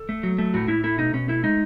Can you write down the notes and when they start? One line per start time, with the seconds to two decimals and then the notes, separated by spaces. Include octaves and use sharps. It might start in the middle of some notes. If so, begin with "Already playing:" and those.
Already playing: A4
0.09 A3
0.23 F#3
0.38 A3
0.54 A2 F#4
0.68 A2 E4
0.84 A3 E4
0.98 B2 D#4
1.13 B2 C#4
1.28 A3 E4
1.44 G#3 D#4